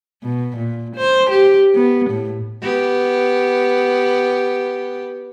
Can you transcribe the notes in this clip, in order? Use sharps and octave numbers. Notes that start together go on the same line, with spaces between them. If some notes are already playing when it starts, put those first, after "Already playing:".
B2
A#2
C5
G4
B3
A2
B3 G4